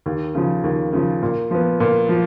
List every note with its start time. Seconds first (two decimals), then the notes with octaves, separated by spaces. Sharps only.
0.06 D#2
0.35 C#3 F3
0.64 D#2
0.93 C#3 F3
1.22 A#2
1.51 F3 B3
1.80 A#2
2.09 F3